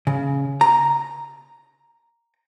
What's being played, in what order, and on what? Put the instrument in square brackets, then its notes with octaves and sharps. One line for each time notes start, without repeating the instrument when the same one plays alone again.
[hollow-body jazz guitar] C#3
A#5